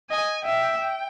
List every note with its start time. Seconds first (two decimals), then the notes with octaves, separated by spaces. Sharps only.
0.10 D#5 G#5
0.45 E5 G5
0.79 G5